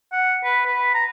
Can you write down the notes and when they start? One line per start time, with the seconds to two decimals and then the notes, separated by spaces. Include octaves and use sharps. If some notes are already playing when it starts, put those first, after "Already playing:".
0.12 F#5
0.44 B4
0.66 B4
0.94 A#5